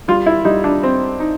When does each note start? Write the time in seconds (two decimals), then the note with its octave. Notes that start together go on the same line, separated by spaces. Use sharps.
0.08 G3 F4
0.26 E4
0.45 G3 D#4
0.64 D4
0.83 C4
1.20 D#4